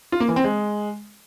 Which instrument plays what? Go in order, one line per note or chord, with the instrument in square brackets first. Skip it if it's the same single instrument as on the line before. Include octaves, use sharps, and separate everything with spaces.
[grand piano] F4
A#3
E3
C4
G#3